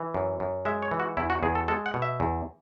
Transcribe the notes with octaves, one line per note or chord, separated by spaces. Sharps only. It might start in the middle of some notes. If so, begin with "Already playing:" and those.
Already playing: E3
F#2
F#2
G#3 E5
C#5
E3
F#4
E2 E4
F#4
E2 G#4
A4
G#3 A4
F#5
B2
E5
E2